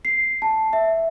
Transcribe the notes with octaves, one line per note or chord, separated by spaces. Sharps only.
C7
A5
E5